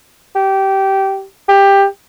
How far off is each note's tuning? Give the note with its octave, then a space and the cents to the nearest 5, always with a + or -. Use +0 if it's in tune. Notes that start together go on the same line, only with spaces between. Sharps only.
G4 -15
G4 +15